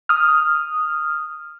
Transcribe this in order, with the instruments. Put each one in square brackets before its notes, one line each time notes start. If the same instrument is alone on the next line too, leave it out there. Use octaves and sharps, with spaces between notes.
[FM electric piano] D#6 F6